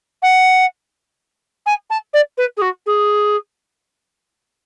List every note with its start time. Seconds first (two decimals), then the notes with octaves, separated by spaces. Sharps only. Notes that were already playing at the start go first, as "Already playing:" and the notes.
0.22 F#5
1.66 G#5
1.90 A5
2.13 D5
2.37 B4
2.57 G#4
2.61 F#4
2.86 G#4